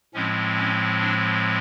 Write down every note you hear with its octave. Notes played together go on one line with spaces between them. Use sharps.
A2 F3 G#3 C4 C#4
C#4
D4